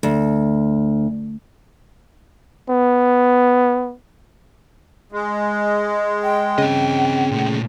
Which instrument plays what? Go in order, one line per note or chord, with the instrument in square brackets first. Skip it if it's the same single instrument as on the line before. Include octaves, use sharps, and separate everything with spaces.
[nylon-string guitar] D2
[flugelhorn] B3
[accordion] G#3
[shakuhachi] G5
[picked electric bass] C#3 [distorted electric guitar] C4 D#5
[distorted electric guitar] A#2 A3